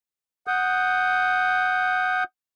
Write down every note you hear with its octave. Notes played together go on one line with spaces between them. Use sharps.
F#5 D#6 G6